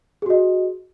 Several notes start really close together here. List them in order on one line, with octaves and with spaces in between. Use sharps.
G#4 F#4 D#5